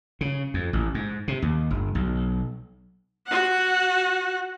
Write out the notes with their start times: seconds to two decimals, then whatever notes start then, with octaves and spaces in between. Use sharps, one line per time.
0.21 C#3
0.54 F2
0.73 A1
0.94 G#2
1.28 C3
1.42 D#2
1.70 G1
1.95 B1
3.27 F#4 F#5